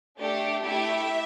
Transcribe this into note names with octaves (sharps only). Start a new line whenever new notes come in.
A3 D4 G4
A3 E4 G4 E5